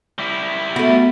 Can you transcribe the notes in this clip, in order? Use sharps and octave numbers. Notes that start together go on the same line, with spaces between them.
G3 E4
A3 B3 F#4